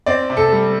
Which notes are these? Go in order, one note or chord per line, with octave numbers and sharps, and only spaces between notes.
C4 D5
C3
A4
G3